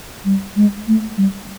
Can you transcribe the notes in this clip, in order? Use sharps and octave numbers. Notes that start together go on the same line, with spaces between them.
G3
G#3
A3
G3